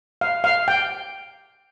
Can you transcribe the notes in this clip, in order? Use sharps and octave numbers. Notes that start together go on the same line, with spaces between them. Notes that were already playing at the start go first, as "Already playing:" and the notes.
F5
F5
G5